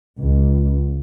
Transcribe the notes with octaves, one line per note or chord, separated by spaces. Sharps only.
C#2